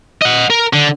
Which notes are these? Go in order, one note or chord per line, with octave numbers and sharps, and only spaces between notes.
D#5 F#5
A#4
D3